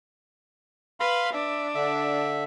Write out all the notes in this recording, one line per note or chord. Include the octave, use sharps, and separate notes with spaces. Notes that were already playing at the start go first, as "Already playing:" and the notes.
B4 F5 B5 C6
D4 E5
D3 E5